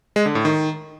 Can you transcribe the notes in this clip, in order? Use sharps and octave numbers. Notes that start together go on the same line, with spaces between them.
G#3
D3
A2
D#3